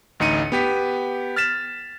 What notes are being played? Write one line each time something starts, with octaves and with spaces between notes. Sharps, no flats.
A1 D2 D#4 C#7 D#7
B3 G4 B6
F6 A6 B6 E7